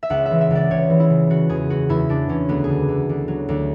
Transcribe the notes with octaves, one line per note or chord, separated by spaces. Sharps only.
E5
C#2 F#5
E5
E3
E5
C#2 D5
C#2 C#5
E3
E4
C#3
C#3 F#4
E2 G#4
E2 F#4
E2 E4
C#3 D4
E2 C#4
D2 B3
G#4
D3
D2
D2
F#3
D2